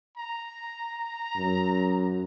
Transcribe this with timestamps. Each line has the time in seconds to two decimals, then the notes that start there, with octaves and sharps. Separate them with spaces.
0.17 A#5
1.36 F#2